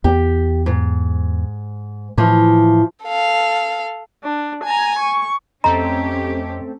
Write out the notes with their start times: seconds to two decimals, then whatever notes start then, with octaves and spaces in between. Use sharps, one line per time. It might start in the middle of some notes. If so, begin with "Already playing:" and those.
0.04 E2 B3 G4
0.66 G#2
2.17 A2 E3 F3
3.05 A4 F5
4.24 D4
4.64 G#5 A#5
4.98 C#6
5.64 F2 A3 C4 C#4 G4 A4 D#5 A#5